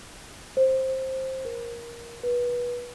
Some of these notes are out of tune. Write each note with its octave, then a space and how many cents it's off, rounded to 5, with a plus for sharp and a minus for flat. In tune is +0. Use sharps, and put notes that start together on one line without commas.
C5 +10
A#4 +15
B4 -25